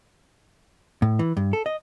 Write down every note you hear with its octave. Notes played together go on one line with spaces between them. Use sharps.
A2
E3
G2
A4
D#5